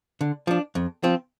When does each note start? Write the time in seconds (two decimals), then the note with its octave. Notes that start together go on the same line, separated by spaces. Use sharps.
0.21 D3
0.47 F3 D4
0.75 F2
1.03 F3 C4